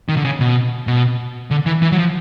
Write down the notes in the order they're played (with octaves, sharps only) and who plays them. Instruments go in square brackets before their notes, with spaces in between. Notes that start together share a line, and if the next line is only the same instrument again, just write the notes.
[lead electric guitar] D#3
D3
C#3
B2
B2
D3
E3
E3
F#3
F3